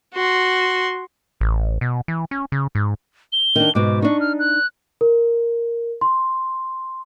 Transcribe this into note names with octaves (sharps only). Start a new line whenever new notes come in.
F#4 C6
A1
B2
E3
C#4
C#3
G#2
G7
D#3 D4
G#2 B2 D6
D4 D#4 C#6
F6
F#6
A#4
C6